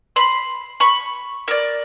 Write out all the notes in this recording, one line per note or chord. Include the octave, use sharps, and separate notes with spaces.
B5 C6
B5 C#6
A#4 D5